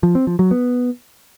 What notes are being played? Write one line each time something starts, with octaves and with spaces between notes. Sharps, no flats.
F3
C4
F3
F#3
B3